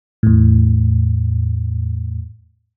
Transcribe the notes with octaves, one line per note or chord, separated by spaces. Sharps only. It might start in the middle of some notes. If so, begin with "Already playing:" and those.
E2 A2